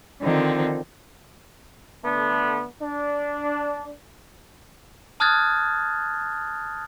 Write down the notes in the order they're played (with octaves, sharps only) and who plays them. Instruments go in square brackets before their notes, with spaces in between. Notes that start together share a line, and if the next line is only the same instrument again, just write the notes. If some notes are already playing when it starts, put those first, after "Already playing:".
[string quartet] D3 D#3 F3 C4 D#4
[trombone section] D3 A3 B3
D4
[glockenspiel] A5 D#6 F6 F#6 G#6 A6